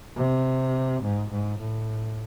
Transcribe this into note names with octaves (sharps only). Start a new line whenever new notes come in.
C3
G#2
G#2
A2